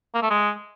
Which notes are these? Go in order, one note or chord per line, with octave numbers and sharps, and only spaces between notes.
A#3
A3
G#3